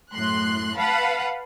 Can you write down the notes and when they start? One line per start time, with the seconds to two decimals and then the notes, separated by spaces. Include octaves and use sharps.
0.12 F#2 A2 C6 F#6
0.77 B4 F5 F#5 A5 B5